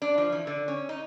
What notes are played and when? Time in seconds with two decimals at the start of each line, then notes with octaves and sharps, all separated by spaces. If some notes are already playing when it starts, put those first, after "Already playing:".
0.02 D4
0.18 F3
0.32 E3
0.47 D3
0.68 C#4
0.89 D#4